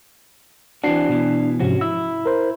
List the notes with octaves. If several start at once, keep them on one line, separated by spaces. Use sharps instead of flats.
E3 C4 D4 F#4 C7
B2 E3
G#2 C3 F3 C#4 F#4
E4 E6
A#4 C5